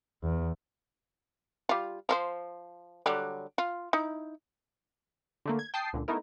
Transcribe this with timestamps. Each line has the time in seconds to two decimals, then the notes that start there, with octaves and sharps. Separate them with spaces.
0.23 E2
1.69 G3 F4
2.09 F3 A4 C5
3.06 D3 F#3 G3
3.58 F4
3.93 D#4 E4
5.46 D3 A3 A#3
5.59 G#6
5.74 G5 A5 D#6 C7
5.93 C#2 A#2 D3
6.08 A3 B3 D#4 E4 A#4